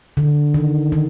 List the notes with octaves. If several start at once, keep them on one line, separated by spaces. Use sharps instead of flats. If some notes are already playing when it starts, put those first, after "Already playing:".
D3
D#3
D#3